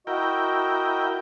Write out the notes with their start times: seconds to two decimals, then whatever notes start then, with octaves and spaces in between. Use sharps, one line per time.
0.07 E4 F#4 A#4 D#5 G5